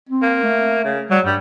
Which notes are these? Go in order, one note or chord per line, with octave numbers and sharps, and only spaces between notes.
C4
A#3
A3
C#3
F#3 G3
G2 G3